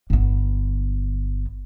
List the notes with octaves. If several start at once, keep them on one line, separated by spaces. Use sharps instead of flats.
G1 B3